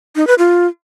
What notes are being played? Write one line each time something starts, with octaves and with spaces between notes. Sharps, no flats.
D#4
B4
F4